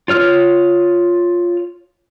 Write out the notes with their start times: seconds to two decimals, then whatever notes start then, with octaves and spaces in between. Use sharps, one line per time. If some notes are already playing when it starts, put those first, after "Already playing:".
0.08 F4 C#5 F6